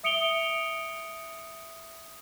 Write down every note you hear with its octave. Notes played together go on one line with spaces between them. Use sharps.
E5 D#6 C#7 D7 F7 G7